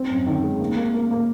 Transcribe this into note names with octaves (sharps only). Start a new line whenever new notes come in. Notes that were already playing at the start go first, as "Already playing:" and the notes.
Already playing: C4
F#2
D#3
G#3
A#3
A#3
A#3
A#3